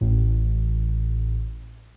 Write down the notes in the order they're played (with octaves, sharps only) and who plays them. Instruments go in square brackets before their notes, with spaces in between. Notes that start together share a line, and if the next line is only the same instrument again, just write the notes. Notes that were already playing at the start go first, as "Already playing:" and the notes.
[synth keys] A1 A2